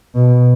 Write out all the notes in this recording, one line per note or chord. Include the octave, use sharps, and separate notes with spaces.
B2